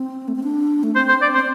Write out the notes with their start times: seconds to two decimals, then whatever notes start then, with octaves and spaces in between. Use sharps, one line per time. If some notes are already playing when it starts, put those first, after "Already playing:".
Already playing: C4
0.28 A3
0.35 C4
0.43 D4
0.83 A3
0.95 C4 C5
1.09 C5
1.22 D5
1.35 C5
1.39 C4